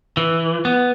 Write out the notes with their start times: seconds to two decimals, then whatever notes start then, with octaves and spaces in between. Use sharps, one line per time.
0.17 E3
0.65 B3